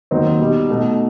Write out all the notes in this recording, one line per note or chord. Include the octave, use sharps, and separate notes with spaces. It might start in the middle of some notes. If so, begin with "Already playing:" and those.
D#2 D#3 F#3 C4 D#4
B2 G3 D#4
B2 A3 D#4